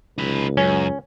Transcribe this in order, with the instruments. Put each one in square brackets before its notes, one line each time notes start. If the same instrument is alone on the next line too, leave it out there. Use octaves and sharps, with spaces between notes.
[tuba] C#2 [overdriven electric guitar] D#4 B4
[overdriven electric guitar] F#2 [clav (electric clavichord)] C#4